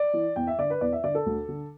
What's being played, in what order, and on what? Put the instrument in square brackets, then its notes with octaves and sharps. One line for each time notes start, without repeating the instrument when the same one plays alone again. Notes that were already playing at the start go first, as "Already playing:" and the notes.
Already playing: [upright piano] D5
E3
E2 G5
E5
D3 D5
B4
E2 D5
E5
D3 D5
A4
D2
D3